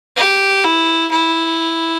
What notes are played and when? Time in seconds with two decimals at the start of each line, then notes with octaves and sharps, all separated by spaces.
0.16 G4
0.64 E4
1.11 E4